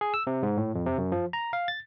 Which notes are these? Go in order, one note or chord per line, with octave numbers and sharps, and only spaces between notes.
G#4
E6
C3
G#2
A2
F2
C3
F#2
F3
A#5
F5
A6